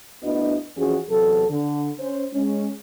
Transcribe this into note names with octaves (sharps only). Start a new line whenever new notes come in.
D2 B3 D4 E4 F#4 D#5
F2 E3 C#4 F#4 G#4
E2 C3 F#3 A4
D3
C#4 C5
G#3 C#4